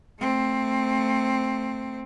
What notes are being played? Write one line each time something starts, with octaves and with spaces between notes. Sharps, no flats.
A3 C4